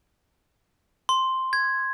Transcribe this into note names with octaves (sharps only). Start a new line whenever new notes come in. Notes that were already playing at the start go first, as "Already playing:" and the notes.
C6
G#6